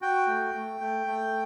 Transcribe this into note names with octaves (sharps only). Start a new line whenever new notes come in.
F#4 G5
A3
A3
A3
A3